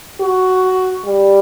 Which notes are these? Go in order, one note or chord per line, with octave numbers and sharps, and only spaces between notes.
F#4
G3